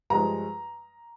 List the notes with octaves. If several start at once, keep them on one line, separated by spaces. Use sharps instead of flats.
G2 F3 G#3 A#5